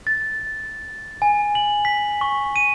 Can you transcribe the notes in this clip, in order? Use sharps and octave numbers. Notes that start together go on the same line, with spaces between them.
A6
G#5
F#7
B6
C#6
D#7